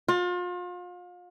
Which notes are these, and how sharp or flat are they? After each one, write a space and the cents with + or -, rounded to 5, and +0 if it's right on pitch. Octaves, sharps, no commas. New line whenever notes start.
F4 +35